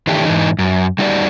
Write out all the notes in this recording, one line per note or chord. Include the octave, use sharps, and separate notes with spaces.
D#3 E3 A3 D4 G4
G#2 E3 D#4
F#2
G3 D#4 F#4 G4 C#5 D5